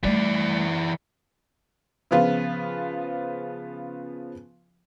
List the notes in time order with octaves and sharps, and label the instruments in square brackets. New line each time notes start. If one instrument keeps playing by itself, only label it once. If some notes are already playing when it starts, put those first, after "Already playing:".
[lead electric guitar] E3 D5 [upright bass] G3 A3
[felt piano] C#3 F3 B3 F4